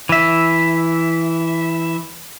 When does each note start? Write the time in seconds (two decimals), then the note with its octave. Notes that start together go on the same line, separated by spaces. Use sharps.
0.09 E3 E5